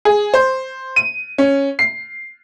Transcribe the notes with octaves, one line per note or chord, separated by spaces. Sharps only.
G#4
C5
D#7
C#4
C7